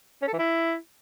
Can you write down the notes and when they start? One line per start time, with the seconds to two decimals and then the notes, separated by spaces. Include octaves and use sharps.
0.22 C#4
0.28 A4
0.33 E3
0.39 E4